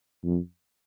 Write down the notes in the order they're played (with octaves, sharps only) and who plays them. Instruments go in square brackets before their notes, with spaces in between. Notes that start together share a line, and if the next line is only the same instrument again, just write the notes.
[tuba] F2